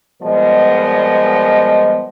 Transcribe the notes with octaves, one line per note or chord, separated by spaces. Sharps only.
A#2 F3 G3 G#3 B3 D#5